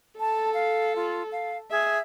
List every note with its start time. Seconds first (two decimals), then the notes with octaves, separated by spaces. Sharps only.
0.20 A4 A5
0.54 F5
0.96 F4
1.32 F5
1.71 G#4 E5